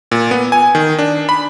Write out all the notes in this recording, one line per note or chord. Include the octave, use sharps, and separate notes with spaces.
A#2
B3
G#5
D#3
D4
B5